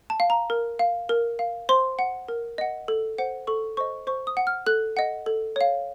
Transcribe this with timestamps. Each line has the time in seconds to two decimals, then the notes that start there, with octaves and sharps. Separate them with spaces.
0.10 A5
0.20 F5
0.30 A#5
0.50 A#4
0.79 F5
1.09 A#4
1.39 F5
1.69 C5 C6
1.99 F#5
2.28 A#4
2.58 D#5 F#5
2.88 A4
3.18 C5 F#5
3.47 A4 C#6
3.77 C5 D#5 C#6
4.07 C5 C#6
4.27 D#6
4.37 F#5
4.47 F6
4.66 A4 F#6
4.97 D#5 F#5
5.26 A4
5.56 C#5 F5